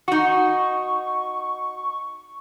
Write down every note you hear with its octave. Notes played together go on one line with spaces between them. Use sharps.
D#4 F#4 C#6